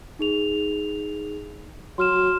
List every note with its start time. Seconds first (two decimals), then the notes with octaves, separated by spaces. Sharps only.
0.19 D#4 G#4 F7
1.98 F#3 C6 F6 E7